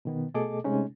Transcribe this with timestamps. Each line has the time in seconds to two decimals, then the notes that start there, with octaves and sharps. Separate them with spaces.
0.05 B2 D#3 B3
0.34 B2 A3 G#4 A4 D#5 D6
0.64 C3 G#3 A3 C#4 D#4